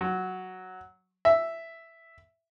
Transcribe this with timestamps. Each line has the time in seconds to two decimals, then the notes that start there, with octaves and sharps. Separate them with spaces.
0.01 F#3
1.25 E5